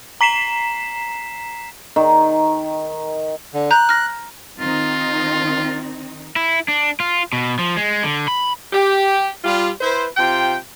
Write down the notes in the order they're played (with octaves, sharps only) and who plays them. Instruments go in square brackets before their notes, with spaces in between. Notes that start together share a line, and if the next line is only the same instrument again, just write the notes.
[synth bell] A#5 B6 C7 E7
[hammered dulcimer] D#3
[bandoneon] D3
[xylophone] A#5 G6 [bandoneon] F#6
[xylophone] F6 A#6
[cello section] D#3 C4 D#4 [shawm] F4
[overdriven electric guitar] E4
D4
F4
B2
F3
G#3
D3
B5
[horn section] G4
G3 F4
E4 B4 C5
C3 F4 G5